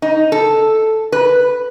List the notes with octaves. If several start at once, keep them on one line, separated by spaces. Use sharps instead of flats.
D#4
A4
B4